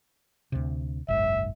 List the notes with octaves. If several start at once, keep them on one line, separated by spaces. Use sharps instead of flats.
D2 C3
F#1 B1 G#2 E5